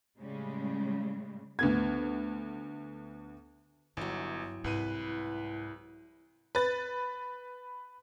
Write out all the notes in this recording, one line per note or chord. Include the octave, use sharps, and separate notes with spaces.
A2 C#3 G3 G#3
D2 B3 G#6
G1 G2 E3 F#3
C2 G#2 E4 B4 D#7
B4 A6